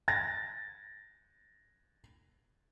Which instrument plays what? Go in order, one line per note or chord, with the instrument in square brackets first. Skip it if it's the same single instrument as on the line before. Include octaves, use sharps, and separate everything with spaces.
[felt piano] A6 A#6